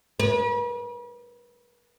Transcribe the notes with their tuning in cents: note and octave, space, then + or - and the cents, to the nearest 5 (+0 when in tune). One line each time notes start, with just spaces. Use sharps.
B4 -40